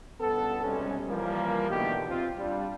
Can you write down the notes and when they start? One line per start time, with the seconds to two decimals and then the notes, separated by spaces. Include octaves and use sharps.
0.21 C#2 G2 B3 A4
0.63 B1 C3 G3 G#3 C#4
1.07 E3 F3 G3 A#3
1.70 B2 D3 E3 A3 D#4 G4
2.08 C4 F4
2.38 G3 D4 F4